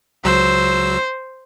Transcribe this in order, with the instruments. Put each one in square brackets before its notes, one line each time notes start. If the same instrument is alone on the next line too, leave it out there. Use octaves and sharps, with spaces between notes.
[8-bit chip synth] C#2 F#3 E6 [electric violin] C5